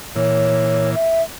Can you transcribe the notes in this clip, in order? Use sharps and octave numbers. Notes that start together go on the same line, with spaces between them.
A#2 E3 C#5
E5